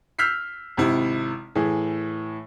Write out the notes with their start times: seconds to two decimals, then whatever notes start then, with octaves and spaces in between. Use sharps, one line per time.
0.18 E6 F6 G6 B6 C7
0.77 G#1 C3 E4
1.55 A2 E3 G#4